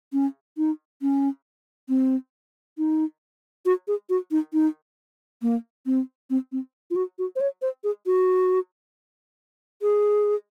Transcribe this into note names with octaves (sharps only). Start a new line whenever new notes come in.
C#4
D#4
C#4
C4
D#4
F#4
G#4
F#4
D#4
D#4
A#3
C4
C4
C4
F4
F#4
F#4
C5
C#5
C5
G#4
F#4
G#4